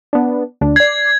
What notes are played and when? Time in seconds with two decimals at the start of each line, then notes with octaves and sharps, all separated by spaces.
0.13 B3 D4
0.61 D2 D3 D4
0.76 D5 G#6 C7